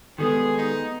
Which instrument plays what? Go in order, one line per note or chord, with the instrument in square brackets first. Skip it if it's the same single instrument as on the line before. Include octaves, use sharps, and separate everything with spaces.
[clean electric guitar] D#3 G3 G#3 [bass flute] B3 [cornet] G#4 [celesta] A4 B4 D#6
[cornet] D#4